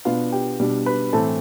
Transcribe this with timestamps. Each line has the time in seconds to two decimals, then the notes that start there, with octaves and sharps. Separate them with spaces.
0.05 B2 B3 D4 F4 F5
0.32 G4 G5
0.60 B2 G3 D4
0.86 B4 B5
1.13 A2 E3 A3 C4 A4 A5